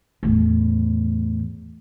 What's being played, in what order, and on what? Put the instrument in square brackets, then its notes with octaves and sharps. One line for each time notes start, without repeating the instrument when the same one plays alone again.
[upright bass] E2 A2